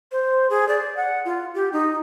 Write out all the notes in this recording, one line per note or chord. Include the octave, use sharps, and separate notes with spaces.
C5
G#4
D5
F#5
F4
G4
D#4